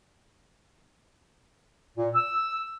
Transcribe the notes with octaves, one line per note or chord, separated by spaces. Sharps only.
A#2
E6